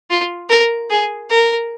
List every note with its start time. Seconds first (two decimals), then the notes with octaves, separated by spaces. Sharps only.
0.10 F4
0.50 A#4
0.90 G#4
1.30 A#4